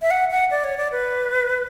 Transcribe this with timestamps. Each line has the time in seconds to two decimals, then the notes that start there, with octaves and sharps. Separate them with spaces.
0.02 E5
0.11 F#5
0.31 F#5
0.51 D5
0.64 C#5
0.77 D5
0.92 B4